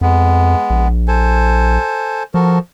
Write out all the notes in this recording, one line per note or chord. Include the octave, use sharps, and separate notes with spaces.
F2 G#3 B3
A#1
A4 C5 G#5
F3 F#4 A4 A#4